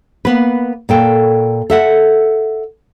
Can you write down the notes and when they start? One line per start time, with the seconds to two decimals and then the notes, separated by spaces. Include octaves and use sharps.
0.25 A#3 B3 B4
0.89 A#2 A4 G5
1.70 A4 E5 F#5